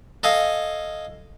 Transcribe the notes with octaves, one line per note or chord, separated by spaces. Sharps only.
A4 D#5 F5 G#5